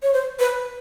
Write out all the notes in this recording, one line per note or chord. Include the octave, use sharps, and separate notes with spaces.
C#5
C5
B4